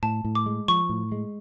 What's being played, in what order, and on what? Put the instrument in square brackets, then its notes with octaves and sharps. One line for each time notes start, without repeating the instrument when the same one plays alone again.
[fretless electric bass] A2 [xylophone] A5
[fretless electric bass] A2
[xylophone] D6
[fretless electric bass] G#3
[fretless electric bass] F3 [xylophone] C#6
[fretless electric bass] A2
G#3